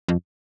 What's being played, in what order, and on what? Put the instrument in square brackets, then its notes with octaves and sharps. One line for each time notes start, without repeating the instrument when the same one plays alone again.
[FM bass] F2